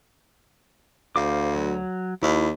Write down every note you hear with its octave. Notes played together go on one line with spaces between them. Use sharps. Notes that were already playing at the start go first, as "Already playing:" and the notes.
D2 C5 F5 D6
F#3
D#2 E4